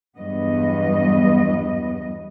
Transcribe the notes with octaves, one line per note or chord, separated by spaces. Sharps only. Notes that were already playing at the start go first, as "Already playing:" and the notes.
E2 G2 F#3 B3 D#5